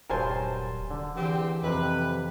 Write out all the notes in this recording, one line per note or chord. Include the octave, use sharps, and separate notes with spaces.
D#1 G2 F#3 A#4 C5 G#5 A5
D3
E2 E3 C4 G4
F2 C3 B4